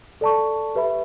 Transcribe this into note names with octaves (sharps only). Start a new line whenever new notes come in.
A4 D5 A5 C#6
G4 B4 E5 B5